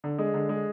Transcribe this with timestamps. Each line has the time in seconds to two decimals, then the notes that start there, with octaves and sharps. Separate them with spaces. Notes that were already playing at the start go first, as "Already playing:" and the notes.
0.04 D3
0.18 G#3
0.34 D3
0.49 G#3